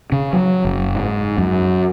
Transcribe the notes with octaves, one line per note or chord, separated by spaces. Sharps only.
C#3
F#3
F#1
G#2
F#2